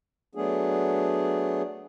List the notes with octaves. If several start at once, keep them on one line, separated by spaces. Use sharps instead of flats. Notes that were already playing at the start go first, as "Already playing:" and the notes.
F#3 A3 B3 D4 G#4